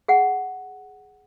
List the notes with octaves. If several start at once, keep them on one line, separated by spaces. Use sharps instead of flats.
G#4 F#5